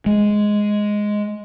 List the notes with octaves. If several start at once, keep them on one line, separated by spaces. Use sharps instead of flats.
G#3